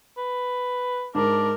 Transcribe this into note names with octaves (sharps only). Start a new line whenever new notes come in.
B4
G#2 D4 A#4